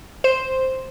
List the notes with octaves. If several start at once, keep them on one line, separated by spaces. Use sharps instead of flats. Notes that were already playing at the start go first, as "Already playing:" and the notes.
C5